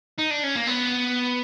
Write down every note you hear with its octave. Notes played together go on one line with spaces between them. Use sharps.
D#4
D4
C#4
A#3
B3